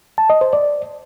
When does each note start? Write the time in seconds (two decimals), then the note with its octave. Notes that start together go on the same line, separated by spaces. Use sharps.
0.18 A5
0.30 D#5
0.41 C5
0.53 D5